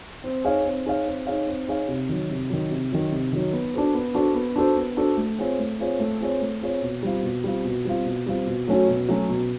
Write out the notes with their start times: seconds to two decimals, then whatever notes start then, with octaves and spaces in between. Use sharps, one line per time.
0.24 C4
0.44 D#4 G#4 C#5 F5
0.65 C4
0.85 D#4 G#4 C#5 F5
1.06 C4
1.27 D#4 G#4 C#5 F5
1.47 C4
1.68 D#4 G#4 C#5 F5
1.88 C3
2.09 D#3 F#3
2.30 C3
2.50 D#3 F#3
2.71 C3
2.92 D#3 F#3
3.12 C3
3.33 D#3 F#3
3.53 B3
3.74 D4 F#4 A4 C5
3.94 B3
4.14 D4 F#4 A4 C5
4.35 B3
4.56 D4 F#4 A4 C5
4.77 B3
4.97 D4 F#4 A4 C5
5.17 A3
5.38 C4 F4 G#4 C#5
5.59 A3
5.79 C4 F4 G#4 C#5
6.00 A3
6.21 C4 F4 G#4 C#5
6.41 A3
6.61 C4 F4 G#4 C#5
6.82 B2
7.03 G3 C4 F4
7.23 B2
7.44 G3 C4 F4
7.65 B2
7.85 G3 C4 F4
8.05 B2
8.26 G3 C4 F4
8.47 B2
8.67 F#3 A3 C#4 F#4
8.88 B2
9.08 F#3 A3 C#4 F#4
9.29 B2